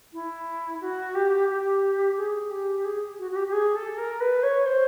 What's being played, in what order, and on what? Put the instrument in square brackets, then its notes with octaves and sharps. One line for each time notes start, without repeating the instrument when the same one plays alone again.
[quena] E4
F#4
G4
G4
G#4
G4
G#4
F#4
F#4
G4
G4
G#4
A4
A#4
B4
C#5
C5